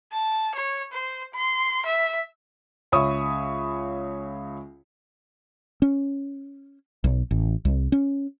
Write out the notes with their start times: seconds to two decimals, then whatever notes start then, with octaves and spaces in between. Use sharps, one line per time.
0.12 A5
0.55 C#5
0.92 C5
1.34 C6
1.86 E5
2.92 C#2 C#5 E5 B5 C#6 D#6
5.82 C#4
7.04 B1
7.31 A1
7.65 C2
7.92 C#4